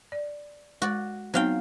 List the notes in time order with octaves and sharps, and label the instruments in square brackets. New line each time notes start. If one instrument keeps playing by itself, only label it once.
[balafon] D5
[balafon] G#3 [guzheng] F#4 D5
[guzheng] F#3 F5 G5 [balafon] B3 C4 D#4